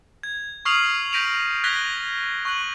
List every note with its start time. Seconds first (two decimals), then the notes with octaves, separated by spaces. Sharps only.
0.23 G#6
0.65 C#6 D#6 F6 C7 F7 F#7
1.13 G6 A#6 B6 D7 D#7 F7
1.64 F#6 G#6 A#6 B6 F7 G7
2.45 C#6 F#6 F#7